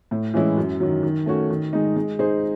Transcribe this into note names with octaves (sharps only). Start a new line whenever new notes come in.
A2
E3 G#3 C#4 E4
F#2
D#3 F#3
D#3
A3 C#4 F#4 C#5
D#3
G#3 D#4
G#3
D#4 G#4 C5